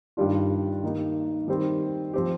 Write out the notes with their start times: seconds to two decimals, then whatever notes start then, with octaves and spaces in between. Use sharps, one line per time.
0.17 G2 D#3 G3 D4 F4
0.84 D#3 A#3 D#4
1.48 D#3 G3 C4
2.13 F3 C4 G4